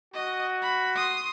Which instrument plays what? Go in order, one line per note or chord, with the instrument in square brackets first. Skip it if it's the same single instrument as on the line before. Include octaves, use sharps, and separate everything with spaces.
[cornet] F#4 [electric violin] D#5
[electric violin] B5
C6 D#6